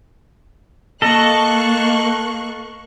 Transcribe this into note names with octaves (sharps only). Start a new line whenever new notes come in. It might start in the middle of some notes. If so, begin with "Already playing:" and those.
A#3 A4 D#5 C#6 F#6